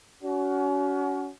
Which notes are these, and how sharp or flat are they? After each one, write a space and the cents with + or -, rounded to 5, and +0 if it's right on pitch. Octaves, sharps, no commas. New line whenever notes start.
C#4 +35 F#4 +20